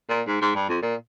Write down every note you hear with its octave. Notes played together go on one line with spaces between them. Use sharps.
A#2
G#2
G#2
G2
F2
A#2